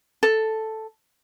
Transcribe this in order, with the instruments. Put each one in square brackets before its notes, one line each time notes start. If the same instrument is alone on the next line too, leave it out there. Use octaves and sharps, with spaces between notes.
[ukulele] A4